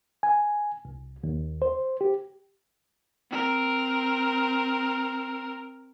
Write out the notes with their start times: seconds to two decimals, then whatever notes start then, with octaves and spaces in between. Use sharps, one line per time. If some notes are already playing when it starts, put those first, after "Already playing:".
0.23 G#5
0.85 C2
1.24 D#2
1.62 C5
2.01 G4
3.31 C4 A#4